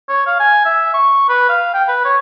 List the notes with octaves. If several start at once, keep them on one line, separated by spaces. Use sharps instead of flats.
C#5
F5
G#5
E5
C#6
B4
F5
G5
B4
C#5